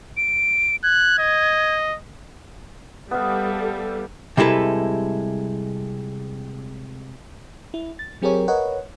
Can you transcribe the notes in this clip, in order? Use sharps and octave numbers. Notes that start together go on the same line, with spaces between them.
D7
F#6 G#6
D#5
G3 B3 A4 E5 F5
C3 G3 G#3 E4 A4 B4
E4
A6
F#3 C4 G4 G#4 A#4 C#5
A#4 B4 C#5 D#5 F#5